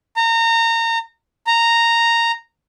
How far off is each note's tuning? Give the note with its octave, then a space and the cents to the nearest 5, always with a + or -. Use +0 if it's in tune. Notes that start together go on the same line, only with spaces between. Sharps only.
A#5 -30
A#5 -10